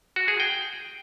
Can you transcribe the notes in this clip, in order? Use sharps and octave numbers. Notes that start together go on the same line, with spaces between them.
F#4
G#4
G5